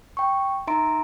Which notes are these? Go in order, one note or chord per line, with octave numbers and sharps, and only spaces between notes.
G5 C#6
D#4 E5 A#5 C6 D7